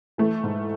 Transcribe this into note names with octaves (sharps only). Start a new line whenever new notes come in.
E3 A3
G#2